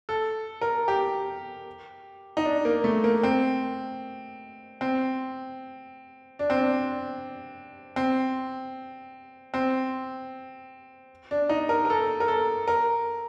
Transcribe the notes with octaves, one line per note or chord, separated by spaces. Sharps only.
A4
A#4
G4
D#4
D4
A#3
A3
A#3
C4
C4
D4
C4
D4
C4
C4
D4
D#4
A#4
A#4
A4
A#4
A4
A#4